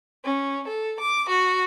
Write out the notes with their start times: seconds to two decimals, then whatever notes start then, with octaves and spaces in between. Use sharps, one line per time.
0.24 C#4
0.67 A4
0.98 D6
1.29 F#4